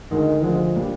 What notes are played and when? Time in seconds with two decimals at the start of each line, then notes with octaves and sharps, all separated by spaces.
0.11 D2 D3 D#3 G#3
0.43 D2 D3 F3 G#3
0.76 A#2 G3 A#3 D4